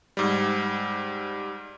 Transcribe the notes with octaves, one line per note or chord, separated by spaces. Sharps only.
G#2 G3